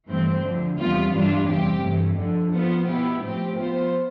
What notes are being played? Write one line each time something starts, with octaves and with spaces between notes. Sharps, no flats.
G2 E3 A3 C4
D2 D3 F3
E2 C3 G3 B3 F4
G2 E3 G3 D4 F4
E2 C3 G3 C4 G4
G2 E3 A3
F2 D3 F3
F3 B3 F4 C5
B2 B3 E4 G4
A2 F3 C4 G4
F3 B3 F4 C5